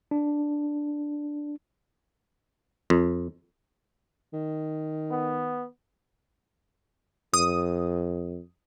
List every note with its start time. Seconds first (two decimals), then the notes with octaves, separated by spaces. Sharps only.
0.11 D4
2.90 F2
4.33 D#3
5.11 B3
7.34 F2 D#6